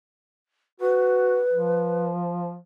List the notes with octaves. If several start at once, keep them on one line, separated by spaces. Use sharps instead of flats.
F#4 B4
F3